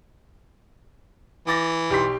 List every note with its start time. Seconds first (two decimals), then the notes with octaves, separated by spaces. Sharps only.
1.47 E3 D6 A6 A#6
1.90 B1 G4 C6 B6